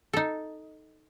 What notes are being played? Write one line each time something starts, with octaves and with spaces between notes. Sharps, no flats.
D#4 A4